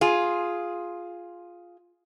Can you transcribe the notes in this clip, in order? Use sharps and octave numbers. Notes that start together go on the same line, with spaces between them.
F4 G#4